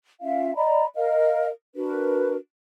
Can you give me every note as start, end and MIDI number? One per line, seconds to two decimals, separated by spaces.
0.21 0.55 61
0.21 0.55 65
0.21 0.55 76
0.21 0.55 77
0.56 0.86 74
0.56 0.86 75
0.56 0.86 82
0.56 0.86 83
0.94 1.48 70
0.94 1.48 75
0.94 1.48 77
1.75 2.35 62
1.75 2.35 66
1.75 2.35 70
1.75 2.35 71